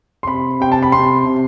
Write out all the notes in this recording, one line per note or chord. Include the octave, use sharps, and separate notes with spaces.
C6
C3 B5
C3 G5
A5
B5
C3 C6
C3